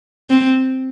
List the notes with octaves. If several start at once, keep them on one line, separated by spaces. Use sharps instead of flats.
C4